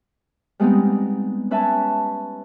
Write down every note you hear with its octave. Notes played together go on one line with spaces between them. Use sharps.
G3 G#3 B3 C4 D#4
C#4 B4 E5 G#5 A5